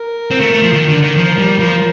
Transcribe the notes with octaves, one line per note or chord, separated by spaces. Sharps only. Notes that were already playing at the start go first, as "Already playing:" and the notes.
Already playing: A#4
C4
A3
A3
F3
D#3
D3
D#3
F3 A#4
G3
F3 A#4